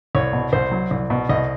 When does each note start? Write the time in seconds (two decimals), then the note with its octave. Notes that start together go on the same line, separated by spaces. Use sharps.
0.15 C2 C#5
0.33 B2
0.53 C2 C5
0.71 F#3
0.91 C2
1.10 B2
1.29 C2 D#5